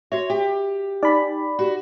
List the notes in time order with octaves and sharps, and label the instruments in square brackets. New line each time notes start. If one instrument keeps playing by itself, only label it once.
[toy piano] F#4 E5 [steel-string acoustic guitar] C#5
[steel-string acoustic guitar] G4
[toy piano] D#4 [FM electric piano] D5 B5
[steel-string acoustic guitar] F#4 [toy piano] G4